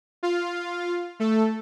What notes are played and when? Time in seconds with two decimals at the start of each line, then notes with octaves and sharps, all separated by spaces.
0.23 F4 F5
1.20 A3 A4